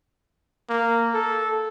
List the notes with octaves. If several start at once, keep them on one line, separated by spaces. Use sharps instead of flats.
A#3
A4